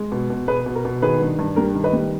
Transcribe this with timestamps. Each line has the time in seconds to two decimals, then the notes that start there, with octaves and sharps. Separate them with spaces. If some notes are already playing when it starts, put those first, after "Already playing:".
Already playing: G#3
0.12 B2
0.30 B2
0.48 B2 G#4 B4
0.66 B2
0.75 A#4
0.85 B2
1.02 D#3 G#4 B4
1.21 G2
1.39 G2
1.56 G3 A#4
1.75 D#3
1.84 B4 D#5
1.93 G3